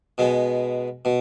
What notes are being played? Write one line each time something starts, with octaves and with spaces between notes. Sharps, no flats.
B2 G#3 B3
B2